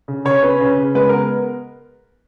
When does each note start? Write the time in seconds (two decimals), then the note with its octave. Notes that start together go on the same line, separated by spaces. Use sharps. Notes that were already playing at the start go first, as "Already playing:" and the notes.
0.08 C#3
0.25 C#3 C#5
0.43 C#4 B4
0.60 C#3
0.78 C#3
0.95 G#3 B4
1.09 B3 A#4